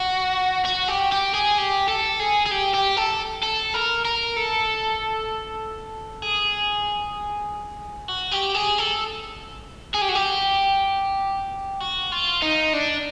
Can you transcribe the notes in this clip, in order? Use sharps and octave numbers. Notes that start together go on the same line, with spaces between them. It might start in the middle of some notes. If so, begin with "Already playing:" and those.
Already playing: F#4
F#4
G4
G4
G#4
G4
A4
G#4
G#4
G4
G4
A4
A4
A#4
A#4
A4
G#4
F#4
G4
G#4
A4
G#4
G4
F#4
G4
F#4
F4
D#4
D4